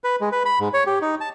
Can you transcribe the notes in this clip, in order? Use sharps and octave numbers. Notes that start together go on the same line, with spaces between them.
B4
G#3
B4
B5
G#2
C#5
G4
D#4
A5